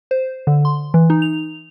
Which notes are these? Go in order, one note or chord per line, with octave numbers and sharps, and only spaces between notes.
C5
D3
C6
E3
D#4
F7